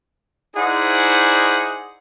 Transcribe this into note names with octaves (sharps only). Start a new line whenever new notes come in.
D#4 E4 G#4 C5 D5 F#5